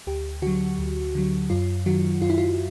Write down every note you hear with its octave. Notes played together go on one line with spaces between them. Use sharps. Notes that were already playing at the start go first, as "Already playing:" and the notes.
D2 G4
D3 F#3 F#4
D2
D3 F#3
F#2 F4
D#3 F#3 F#4
F#2 F4
E4
F4